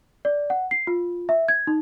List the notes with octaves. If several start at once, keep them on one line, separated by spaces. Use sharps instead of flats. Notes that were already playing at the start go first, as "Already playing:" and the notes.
D5
F#5
C7
F4
E5
G#6
D#4